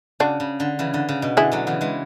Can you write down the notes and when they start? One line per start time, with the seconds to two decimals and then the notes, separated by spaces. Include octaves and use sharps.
0.20 C#3 D4 F#4
0.40 C#3
0.60 D3
0.79 C#3 E3
0.94 D3
1.09 C#3
1.22 B2
1.37 D3 E4 G#4
1.52 D3 F#3
1.67 C#3 E3
1.81 E3 G#3